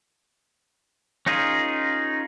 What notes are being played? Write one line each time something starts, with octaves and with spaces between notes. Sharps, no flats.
C#4 D#4 F4 G#4 A#4